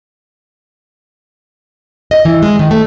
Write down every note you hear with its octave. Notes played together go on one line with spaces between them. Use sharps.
D#5
E3
G#3
D#3
A3